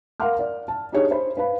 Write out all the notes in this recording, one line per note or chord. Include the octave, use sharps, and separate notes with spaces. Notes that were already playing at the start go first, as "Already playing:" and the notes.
A#4 F5 F#5 C6 D6 F6
D5
A5
D4 D#4 G4 G#4 C#5
C5 B5
B4 F5 B5